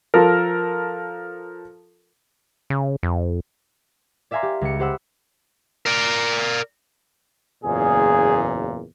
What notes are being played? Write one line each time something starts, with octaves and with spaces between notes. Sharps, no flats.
F3 A4 A#4
C#3
F2
D5 E5 F5 G#5 A#5 C6
G4
C#2 C#7
G4 C5 F#5 B5 E6
A#4 D5
F#1 E2 A#2 G#4